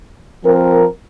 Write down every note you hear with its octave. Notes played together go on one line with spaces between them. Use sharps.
F3 C4 A#4